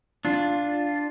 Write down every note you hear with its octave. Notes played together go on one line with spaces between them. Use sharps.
D4 F4